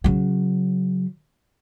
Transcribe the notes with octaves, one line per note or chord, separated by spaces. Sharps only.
C#3 F#3